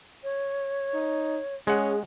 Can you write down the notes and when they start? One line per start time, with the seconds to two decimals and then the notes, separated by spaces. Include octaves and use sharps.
0.24 C#5
0.94 D#4
1.67 G#3 C#4 G#4 F#5